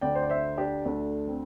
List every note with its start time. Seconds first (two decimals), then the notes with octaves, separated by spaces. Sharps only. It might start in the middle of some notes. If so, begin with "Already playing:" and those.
0.01 D2 D3 D5 G5
0.15 C5
0.22 D5
0.29 C5 E5
0.58 D4 G4
0.85 D2 D3 A3 D4
1.28 C4